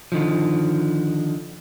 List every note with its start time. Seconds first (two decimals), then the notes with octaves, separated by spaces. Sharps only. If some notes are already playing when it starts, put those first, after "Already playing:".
0.12 D3 D#3 F3